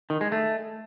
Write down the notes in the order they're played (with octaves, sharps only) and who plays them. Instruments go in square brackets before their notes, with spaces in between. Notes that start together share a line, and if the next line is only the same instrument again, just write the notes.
[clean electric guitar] D#3
G#3
A3